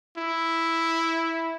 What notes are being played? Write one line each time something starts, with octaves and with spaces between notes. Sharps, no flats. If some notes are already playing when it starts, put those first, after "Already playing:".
E4